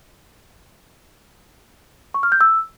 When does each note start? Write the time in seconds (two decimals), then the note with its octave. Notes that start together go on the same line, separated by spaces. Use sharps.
2.14 C#6
2.23 F6
2.32 G6
2.41 E6